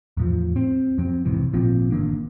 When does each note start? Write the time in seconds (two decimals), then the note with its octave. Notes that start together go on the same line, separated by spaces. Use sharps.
0.17 E2 A2 F3
0.56 C4
0.98 F2 F#3 C4
1.25 B1 G#2 C3 E3
1.53 G#1 A#2 F3 C4
1.91 G1 D#3 A#3 D4